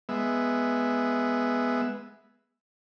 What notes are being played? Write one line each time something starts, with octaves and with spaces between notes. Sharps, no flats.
G#3 B3 E5